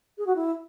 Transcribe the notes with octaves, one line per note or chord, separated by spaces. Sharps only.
G#4
F#4
E4